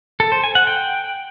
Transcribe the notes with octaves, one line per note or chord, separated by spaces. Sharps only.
A4
C5
G#5
F#5
G5